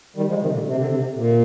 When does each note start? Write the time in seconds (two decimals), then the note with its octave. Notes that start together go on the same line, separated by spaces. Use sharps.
0.17 D#3 G3
0.29 F3 G#3
0.41 C3 D#3
0.54 A#2 D3
0.66 C3
0.76 D3
0.86 C3
1.15 A#2